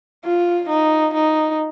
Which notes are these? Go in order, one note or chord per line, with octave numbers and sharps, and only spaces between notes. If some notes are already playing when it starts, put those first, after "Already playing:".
F4
D#4
D#4